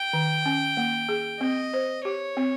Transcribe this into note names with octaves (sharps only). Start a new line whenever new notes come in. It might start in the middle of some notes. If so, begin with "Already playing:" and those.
Already playing: G5
D#3
C#4
A#3
G#4
C4 D#5
C5
G4 C#5
C4